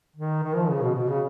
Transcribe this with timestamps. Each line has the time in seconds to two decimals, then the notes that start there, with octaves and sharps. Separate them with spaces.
0.16 D#3
0.43 D#3
0.56 F3
0.69 C#3
0.82 B2
0.95 B2
1.08 C#3